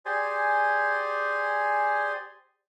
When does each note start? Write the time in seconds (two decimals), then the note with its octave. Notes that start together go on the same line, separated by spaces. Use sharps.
0.06 G4 G#4 C5 D5 G#5